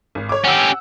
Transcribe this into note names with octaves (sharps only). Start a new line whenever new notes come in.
G#1
C#5 D6
C#4 G4 F#5 E6